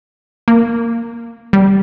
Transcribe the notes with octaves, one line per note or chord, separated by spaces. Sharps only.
A#3
G3